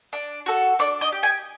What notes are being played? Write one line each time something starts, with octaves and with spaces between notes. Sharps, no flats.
D4
F#4 A4
D4 D5
D#5
G4
G#5